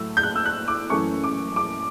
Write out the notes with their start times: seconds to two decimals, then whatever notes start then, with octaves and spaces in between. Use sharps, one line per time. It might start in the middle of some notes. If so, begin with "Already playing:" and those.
Already playing: A2 F#3 A3 E6
0.17 G6
0.23 F#6
0.36 E6
0.46 F#6
0.68 D6
0.90 F#2 E3 A3 C#4 C#6
1.24 D6
1.56 D6